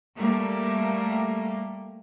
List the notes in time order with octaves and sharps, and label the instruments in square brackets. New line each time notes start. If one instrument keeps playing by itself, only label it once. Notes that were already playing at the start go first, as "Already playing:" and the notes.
[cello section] G3 A3 A#3